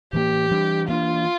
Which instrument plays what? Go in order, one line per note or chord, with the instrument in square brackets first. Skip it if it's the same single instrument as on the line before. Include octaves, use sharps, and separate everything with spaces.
[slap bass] A2 E3 A#3 [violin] G4
[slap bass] E3 G3 D4
[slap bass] E3 A#3 D4 [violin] F4